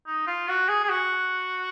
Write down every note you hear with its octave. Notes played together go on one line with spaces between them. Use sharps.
D#4
F4
F#4
G#4
G#4
F#4